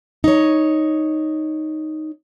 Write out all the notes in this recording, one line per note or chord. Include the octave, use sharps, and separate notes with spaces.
D#4 C#5